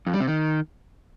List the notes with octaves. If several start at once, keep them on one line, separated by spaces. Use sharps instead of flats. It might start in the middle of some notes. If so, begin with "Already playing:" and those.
F2
G3
C3
D#3